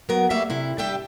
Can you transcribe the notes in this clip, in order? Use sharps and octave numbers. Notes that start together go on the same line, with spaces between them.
F#3 B3 A#4
G3 A3 A#3 E5 F5
C3 E4
G3 D4 G4 E5 G5